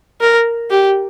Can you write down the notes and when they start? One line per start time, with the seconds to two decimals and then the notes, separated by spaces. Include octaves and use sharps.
0.21 A#4
0.70 G4